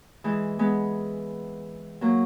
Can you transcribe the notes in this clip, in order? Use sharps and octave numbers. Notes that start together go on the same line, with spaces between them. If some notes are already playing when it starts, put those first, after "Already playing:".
E3 G#3
G#3 B3
F#3 A#3